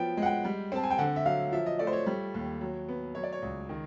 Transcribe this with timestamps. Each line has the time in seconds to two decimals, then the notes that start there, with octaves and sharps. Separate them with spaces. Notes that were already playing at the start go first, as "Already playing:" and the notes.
Already playing: F3 F#3 B3 G5
0.17 G#3
0.22 F#5
0.26 G5
0.44 G3
0.72 C4 A5
0.83 G#5
0.90 G5
0.98 D3 F#5
1.16 E5
1.25 F#3 F5
1.52 F3 E5
1.66 D#5
1.79 A3 D5
1.87 C5
1.93 C#5
2.06 G3
2.34 D#2
2.61 F#3
2.88 B3
3.15 F#3 C#5
3.23 D5
3.33 C#5
3.42 C#2
3.69 D#3